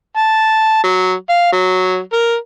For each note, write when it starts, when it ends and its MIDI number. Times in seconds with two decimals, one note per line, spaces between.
0.17 0.83 81
0.84 1.13 54
1.29 1.52 77
1.52 1.99 54
2.13 2.35 70